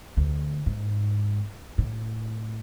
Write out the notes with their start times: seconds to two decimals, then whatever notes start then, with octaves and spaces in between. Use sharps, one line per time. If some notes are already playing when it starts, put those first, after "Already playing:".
0.17 D2
0.66 G#2
1.78 A2